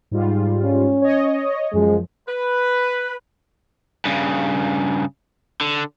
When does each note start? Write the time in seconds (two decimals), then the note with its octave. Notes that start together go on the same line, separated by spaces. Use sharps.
0.11 G#2 G3 F4
0.63 C#4
1.02 C#5 D#5
1.73 F#2 F3 G#3
2.28 B4
4.05 G2 C#3
5.61 D3